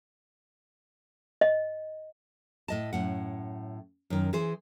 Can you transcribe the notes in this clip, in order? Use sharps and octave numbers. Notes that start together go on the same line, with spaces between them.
D#5
A2 D#5 A5
F#2 A2 F#5
F#2 D#3
E3 G#4 C5